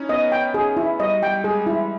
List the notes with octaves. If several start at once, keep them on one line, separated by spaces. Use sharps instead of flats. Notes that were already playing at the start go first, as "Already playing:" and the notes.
Already playing: C#4 D#4 E4
B3 D#5
G5
C#4 G#4
E4
G3 D#5
G3 G5
G#3 G#4
G3 E4